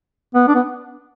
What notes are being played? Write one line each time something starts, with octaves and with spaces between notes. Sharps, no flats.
B3
D4
B3